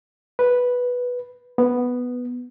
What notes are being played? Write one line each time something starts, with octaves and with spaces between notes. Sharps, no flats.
B4
B3